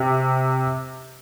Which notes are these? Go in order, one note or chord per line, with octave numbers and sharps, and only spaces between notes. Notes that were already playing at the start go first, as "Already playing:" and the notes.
Already playing: C3